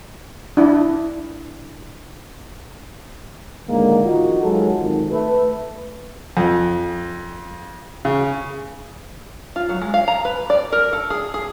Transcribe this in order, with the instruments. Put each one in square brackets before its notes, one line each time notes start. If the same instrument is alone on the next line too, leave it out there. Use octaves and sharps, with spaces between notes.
[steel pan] D4 E4
[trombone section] A2 D3 D#3 G#3 A#3
D#3 F3 D#4 F4 F#4
D#2 F#3 G#3 F4 A4
G#1
A3 B4
[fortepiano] F2
C#3
[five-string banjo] F4
F#3
G#3
F5
A#5
B4
D5
A#4
A4
G#4
G#4